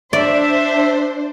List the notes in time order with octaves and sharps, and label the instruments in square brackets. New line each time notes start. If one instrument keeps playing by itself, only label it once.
[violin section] D4 C5 [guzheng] D5 [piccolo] E5